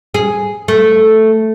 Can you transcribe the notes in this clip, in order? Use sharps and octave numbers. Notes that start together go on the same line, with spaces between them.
G#4
A3